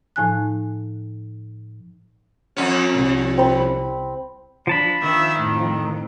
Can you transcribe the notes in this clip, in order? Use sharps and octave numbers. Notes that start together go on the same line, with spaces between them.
A2 F3 D#4 G#5 A5 F#6
F2 C#4
C2
C4 B5
F3 D4 A5 B5
D#3 E5
F2 A2